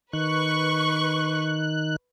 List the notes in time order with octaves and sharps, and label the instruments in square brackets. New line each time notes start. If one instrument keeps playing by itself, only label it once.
[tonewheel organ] D#3 F#6 [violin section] B4 C#6